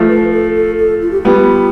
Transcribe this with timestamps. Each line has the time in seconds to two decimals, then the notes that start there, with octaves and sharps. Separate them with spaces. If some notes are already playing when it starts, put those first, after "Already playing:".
Already playing: F3 A3
0.08 B4
0.31 A4
0.55 A4
0.78 A4
1.01 F4
1.11 G4
1.22 G3 B3 F4